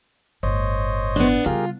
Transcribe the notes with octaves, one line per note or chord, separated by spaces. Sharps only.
G1 A2 C5 C#5 D#5
B3 D4
C#3 G3 F4 G4 G#4 A#4